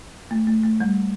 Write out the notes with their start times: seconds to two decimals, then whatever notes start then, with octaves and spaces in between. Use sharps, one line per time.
0.31 A3
0.47 A3
0.63 A3
0.80 G3